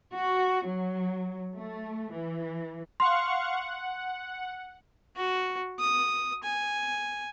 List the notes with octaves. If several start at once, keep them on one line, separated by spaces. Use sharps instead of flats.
F#4
F#3
A3
E3
F5 F#5 C6 C#6
F#5
F#4
D#6
G#5